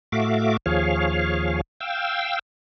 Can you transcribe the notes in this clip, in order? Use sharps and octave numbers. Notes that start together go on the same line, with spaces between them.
A2 A3 F#4 E5 F5 D6
D#2 F3 G#4 C#5 F5
F5 G5 E6